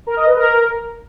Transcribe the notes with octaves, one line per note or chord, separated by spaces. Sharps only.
A#4
D#5
B4
A#4